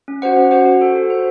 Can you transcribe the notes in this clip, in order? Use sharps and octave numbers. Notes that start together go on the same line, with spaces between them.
C#4
F#4 C5 F#5
C#4
F#4 C5 F#5
F#4
A4 C5
F#4
A4 C5